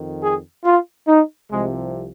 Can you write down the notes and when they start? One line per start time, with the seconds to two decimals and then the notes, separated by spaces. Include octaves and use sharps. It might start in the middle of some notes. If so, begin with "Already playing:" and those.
Already playing: F2 D#3
0.22 G#4
0.64 F4
1.07 D#4
1.50 C2 C3 F3 G#3